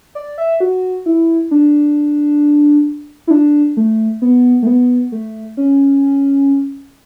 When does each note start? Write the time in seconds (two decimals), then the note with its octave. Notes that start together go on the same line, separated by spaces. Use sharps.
0.15 D5
0.38 E5
0.60 F#4
1.06 E4
1.51 D4
3.27 E4
3.31 D4
3.77 A3
4.22 B3
4.62 A3
4.67 B3
5.12 A3
5.57 C#4